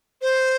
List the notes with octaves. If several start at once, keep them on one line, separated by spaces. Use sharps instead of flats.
C5